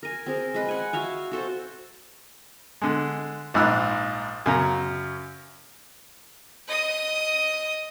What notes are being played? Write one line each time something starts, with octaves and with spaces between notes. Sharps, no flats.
A#4 G#5
C4 G#4 A#4
G#3 B4
F#5 G#5
F#4 E5 F5 G#5
F#4 A4 C5
D3 G#3
A#1 G#2 D#4 B5 E6 F#6
F#2 C#3 A#5
D#5 D#6